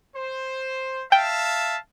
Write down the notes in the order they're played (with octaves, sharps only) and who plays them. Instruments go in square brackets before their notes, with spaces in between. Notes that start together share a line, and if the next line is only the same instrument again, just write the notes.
[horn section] C5
[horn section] E5 F5 A5 [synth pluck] G5